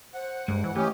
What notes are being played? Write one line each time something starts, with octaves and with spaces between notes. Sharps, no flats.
C5 F#5
G2 G#3
E3
E3 A3 C#4 G4 D#5